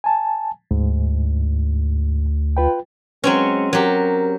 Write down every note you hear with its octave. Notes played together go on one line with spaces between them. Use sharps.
G#5 A5
D2 G#2
F4 B4 G5
F#3 G#3 C4 C#4
F#3 G4 A#4